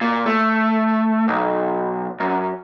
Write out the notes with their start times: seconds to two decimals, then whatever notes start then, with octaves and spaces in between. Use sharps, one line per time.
0.01 A#2
0.26 A3
1.28 B1
2.20 F#2